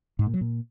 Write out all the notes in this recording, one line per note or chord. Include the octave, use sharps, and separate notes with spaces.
G#2
A#2
F#3
A#2